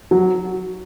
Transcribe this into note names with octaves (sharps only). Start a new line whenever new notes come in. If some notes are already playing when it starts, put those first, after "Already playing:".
F#3